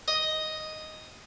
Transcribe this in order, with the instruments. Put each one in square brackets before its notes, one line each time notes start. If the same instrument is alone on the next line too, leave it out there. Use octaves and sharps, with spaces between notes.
[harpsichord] D#5